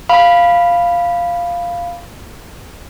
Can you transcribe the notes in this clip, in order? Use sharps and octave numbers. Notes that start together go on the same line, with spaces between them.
F5 B5